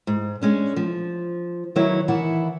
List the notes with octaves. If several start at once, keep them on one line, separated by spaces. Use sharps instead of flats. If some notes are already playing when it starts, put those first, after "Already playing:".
G#2
G#3 C#4 D4
F3
D#3 F#3 E4 B4 C#5
D#3 E3 E4 F#5